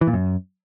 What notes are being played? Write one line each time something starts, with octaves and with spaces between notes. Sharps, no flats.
E3
A#2
F#2